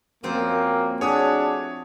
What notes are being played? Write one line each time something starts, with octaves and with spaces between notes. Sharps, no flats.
F#2 F3 A#3 C4 C5
A3 D4 F#4 G#4 C#5 D#6